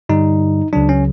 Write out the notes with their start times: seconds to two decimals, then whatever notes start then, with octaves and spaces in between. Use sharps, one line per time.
0.09 G2 D3 G3 D#4
0.73 C#2 C#3 F#3 D4
0.89 C#4